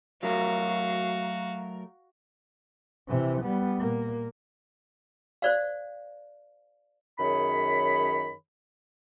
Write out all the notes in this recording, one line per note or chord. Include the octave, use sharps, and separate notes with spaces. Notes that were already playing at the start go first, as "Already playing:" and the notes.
F#3 A3 F#4 A#4 F5
C3 E3
G3 B3
A#2 A#3
C5 D5 F5
F#2 D#3 G#4 C#5 B5